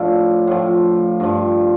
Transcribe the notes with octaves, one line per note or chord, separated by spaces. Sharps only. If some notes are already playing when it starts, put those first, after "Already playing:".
Already playing: A2 F3 D4
A2 F3
G2 F3